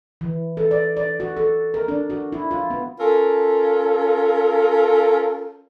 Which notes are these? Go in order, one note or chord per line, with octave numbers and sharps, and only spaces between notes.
E3
A4
D5
D5
F#4
A4
A#4
D4
F#4
E4
F4
B3
C#4 F4 A4 A#4